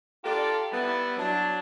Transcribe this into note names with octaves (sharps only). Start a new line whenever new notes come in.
D4 F4 G4 A4 A#4 D5
G3 B3 E4
F#3 D4